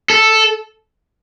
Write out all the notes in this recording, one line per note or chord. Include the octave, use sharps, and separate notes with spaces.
A4